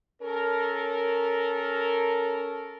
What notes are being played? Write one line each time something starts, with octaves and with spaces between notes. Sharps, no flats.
C#4 A4 A#4